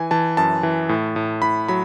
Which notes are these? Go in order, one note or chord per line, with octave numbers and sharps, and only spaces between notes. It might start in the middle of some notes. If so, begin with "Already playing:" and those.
Already playing: E3 G#5
E3 A5
F#2 A5
E3
A2
A2
A2 B5
F#3 B5